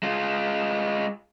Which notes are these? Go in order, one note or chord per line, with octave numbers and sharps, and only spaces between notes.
G#3 F4